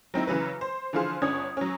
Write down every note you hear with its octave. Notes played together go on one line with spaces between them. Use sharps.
F#3 C4 D#4 E4
C#3 E3 F#3 B4
C5
D3 E3 F3 F4 G#4 C5
G1 C#4 D4 D#6 G#6
F#3 C#4